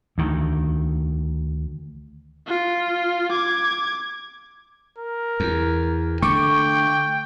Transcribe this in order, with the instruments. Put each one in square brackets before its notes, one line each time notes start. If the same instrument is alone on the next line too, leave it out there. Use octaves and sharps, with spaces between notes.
[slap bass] D2 D#3
[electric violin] F4
D6 G#6
[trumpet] A#4
[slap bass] E2
[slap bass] D3 A3 [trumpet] G5 [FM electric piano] C#6 D6